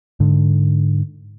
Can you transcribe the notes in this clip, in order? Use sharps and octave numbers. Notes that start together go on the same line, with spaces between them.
G#2 D3